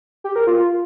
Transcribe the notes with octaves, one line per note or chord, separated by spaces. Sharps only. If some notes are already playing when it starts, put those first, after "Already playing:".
G4
A#4
F4